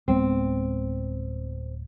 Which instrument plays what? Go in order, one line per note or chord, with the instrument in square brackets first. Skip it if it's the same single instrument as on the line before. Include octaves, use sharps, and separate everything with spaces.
[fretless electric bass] D1 G#3 B3 [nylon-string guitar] C4